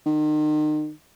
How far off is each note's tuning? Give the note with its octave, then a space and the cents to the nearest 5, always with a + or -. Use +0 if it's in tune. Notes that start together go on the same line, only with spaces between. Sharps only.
D#3 -35